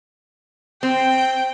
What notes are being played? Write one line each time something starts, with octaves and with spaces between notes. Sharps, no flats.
C4 G5